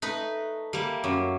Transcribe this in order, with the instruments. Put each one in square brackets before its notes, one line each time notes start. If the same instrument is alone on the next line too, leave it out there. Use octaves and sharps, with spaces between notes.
[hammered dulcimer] A3 [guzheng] D#4 B4
[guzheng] G3 A#3
[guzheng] F#2 [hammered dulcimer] F#4 C#5 D6